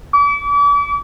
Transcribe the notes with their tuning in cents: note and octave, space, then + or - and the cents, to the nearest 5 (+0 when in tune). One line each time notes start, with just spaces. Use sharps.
D6 -40